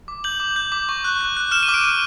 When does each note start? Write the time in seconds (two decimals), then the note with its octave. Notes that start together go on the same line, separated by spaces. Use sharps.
0.08 D6
0.24 G6 F#7
0.40 D6
0.56 G6
0.72 D6
0.89 C#6
1.04 F#6
1.21 F#6
1.37 F#6
1.51 F6 E7
1.63 D#7
1.69 D6
1.74 D7
1.84 F6 D#7